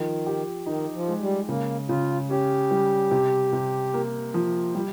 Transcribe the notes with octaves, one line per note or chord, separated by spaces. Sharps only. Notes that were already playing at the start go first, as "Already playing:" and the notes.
Already playing: D#3 F3
G4
D#3 D#4
F3
G#3
G3
C#3 A#3
C#3 F4
C#4 G4
G3
C3
C3
A#3
F3
G3